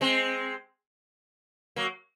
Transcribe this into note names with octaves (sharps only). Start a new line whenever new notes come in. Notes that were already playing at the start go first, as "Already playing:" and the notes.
G#3 C4
F#3 A#3